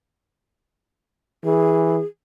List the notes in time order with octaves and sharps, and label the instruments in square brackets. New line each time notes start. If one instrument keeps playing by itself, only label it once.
[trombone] E3 [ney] G#4